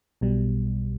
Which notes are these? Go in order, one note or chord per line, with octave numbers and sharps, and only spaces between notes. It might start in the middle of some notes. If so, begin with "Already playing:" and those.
B1 B2 G3